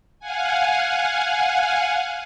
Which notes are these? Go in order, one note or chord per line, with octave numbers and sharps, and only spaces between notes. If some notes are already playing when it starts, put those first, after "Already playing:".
F5 F#5 G#5